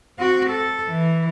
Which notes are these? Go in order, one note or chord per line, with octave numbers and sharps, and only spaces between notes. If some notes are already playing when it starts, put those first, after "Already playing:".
C4 F#4
A4
E3